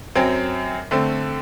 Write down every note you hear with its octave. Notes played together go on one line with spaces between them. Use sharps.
F#2 F#3 C4 G5
D3 A3 C4